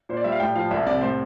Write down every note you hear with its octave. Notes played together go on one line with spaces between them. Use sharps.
A#2 C5
D5
G3 E5
F5
A2 G5
F3 F5
C2 E5
C3 D5
A2 C5